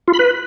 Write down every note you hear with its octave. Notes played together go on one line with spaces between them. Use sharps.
F4
B5
B4